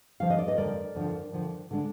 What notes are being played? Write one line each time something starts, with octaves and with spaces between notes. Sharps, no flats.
F2 D3 F3 F5
D#5
D5
B4 D#5
F2 D3 F3 A#4 D5
F2 D3 F3
F2 D3 F3
D3 G#3 D4